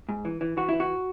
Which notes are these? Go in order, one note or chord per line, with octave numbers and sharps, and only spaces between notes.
G#2
E3
E3
E3 F#4
E3 E4
F#4